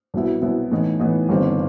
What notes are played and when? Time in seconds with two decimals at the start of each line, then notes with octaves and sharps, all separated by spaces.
0.14 C2 B2 F#3 B3 E4
0.42 C2 B2 F#3 B3 E4
0.71 A2 E3 B3 D#4
1.00 A2 E3 B3 D#4
1.29 G1 G2 D#3 G3 C4